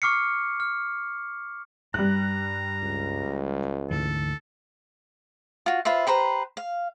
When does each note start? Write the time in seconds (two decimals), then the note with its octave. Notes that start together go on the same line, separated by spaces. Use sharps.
0.02 C#6 D6 F6 C7 C#7
0.60 F6
1.94 G2 G3 A#5 F#6
2.83 C#2
3.91 D2 G#2 E3 A4
5.66 F4 F#4
5.85 F4 B4 C5 E5
6.07 G4 B4 C5 A#5
6.57 F5